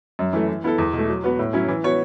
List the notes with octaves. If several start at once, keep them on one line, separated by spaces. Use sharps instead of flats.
F#2
E3 A3
E3
B3 E4 A4
E2
B2 A3
F#3
B3 F#4 B4
A2
F#3 C#4 E4
E3
B3 F#4 C#5